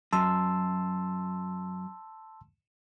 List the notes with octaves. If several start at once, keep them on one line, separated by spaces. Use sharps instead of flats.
F#2 A5 C6 E6